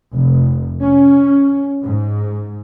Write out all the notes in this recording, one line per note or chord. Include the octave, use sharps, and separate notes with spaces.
F1
C#4
G#2